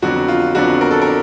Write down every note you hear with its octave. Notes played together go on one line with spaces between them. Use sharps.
F2 D3 F#3 B3 D4 F#4
F4
F2 D3 F#3 B3 D4 F#4
A#4
A4
A#4
D4